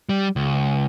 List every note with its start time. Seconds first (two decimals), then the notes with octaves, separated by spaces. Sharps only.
0.09 G3
0.36 C#2